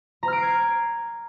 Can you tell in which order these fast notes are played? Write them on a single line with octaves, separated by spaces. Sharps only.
A#5 F6 D7 C7 G#6